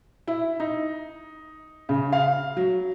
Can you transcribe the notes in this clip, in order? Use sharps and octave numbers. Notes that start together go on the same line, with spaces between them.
E4
D#4
C#3
F5
F#3